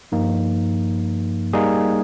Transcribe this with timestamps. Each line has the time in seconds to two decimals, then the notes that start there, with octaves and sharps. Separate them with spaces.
0.12 G2 F3 A#3 D#4
1.53 G3 A#3 D#4 G#4